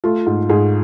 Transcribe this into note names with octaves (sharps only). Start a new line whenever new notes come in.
A3 F4
G#2
G#2 G#4